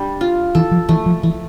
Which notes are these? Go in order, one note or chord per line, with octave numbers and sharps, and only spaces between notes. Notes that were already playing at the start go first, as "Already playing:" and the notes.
Already playing: G3 D4
F4
E3 A4
F3
E3 A3
F3
E3 A3